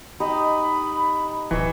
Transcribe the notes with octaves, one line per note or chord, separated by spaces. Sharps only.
D#4 G4 D#5 B5
D1 E3 C#6 E6